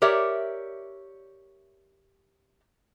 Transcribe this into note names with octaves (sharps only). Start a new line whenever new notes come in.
G4 A#4 C#5 D5 E5